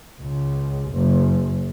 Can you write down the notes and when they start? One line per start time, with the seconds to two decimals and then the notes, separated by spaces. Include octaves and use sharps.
0.21 C#2
0.90 F#1